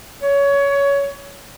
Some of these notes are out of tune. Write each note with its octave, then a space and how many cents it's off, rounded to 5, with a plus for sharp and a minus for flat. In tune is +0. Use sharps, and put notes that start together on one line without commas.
C#5 +20